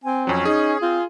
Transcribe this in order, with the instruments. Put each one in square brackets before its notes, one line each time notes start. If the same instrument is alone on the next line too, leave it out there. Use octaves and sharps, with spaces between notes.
[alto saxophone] C4 [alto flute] G#5
[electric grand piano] F2 F#3 [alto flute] C#4
[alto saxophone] D#4 [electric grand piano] G#4
[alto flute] C4 [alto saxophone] F4